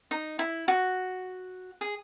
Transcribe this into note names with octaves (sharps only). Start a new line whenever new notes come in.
D#4
E4
F#4
G#4